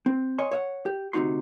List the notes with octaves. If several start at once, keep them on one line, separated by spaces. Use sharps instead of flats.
C4
C#5 D#5 G#5 C6
C#5 E5 F#5
G4
D2 C3 F#3 D#4 F#4 C6